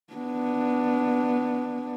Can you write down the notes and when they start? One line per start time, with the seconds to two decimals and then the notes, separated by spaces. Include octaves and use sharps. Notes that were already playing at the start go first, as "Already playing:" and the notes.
0.14 B3 D4